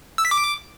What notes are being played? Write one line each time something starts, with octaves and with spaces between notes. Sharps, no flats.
E6
B6
D6